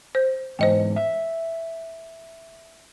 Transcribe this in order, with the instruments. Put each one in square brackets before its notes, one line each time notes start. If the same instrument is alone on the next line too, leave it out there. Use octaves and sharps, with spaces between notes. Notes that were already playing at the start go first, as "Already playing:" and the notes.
[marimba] C5 G6
[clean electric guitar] E2 G#2 [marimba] C5 D#5 G5
[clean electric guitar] E5